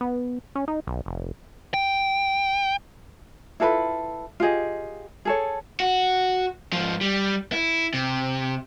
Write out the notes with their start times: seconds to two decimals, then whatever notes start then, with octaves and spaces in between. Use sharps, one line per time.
0.01 B3
0.55 C#4
0.68 D#4
0.87 B1
1.06 F1
1.74 G5
3.60 E4 F4 A4 B4
4.40 F4 G4 G#4 D#5
5.25 G#4 A4 C#5
5.80 F#4
6.73 G#2 F3
7.01 G3
7.52 E4
7.94 C3